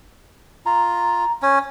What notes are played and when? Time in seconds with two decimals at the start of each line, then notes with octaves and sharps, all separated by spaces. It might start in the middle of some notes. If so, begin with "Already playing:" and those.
0.66 F4 A#5
1.42 C#4